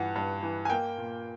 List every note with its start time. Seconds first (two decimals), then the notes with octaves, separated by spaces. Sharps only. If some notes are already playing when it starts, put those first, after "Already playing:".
Already playing: G2 E3 F#5
0.16 G2
0.43 E3
0.65 G#5
0.70 A#3 G5
0.98 A#2